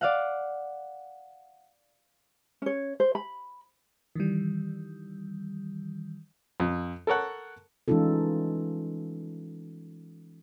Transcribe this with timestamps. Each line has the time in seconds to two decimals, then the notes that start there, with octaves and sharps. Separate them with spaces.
0.01 D5 F5 F#5
2.62 C#4 C#5
3.00 C5
3.15 B5
4.15 D#3 E3 G3
6.60 F2
7.07 A4 A#4 C#5 F#5
7.88 E3 G#3 C#4 D#4 F4 A4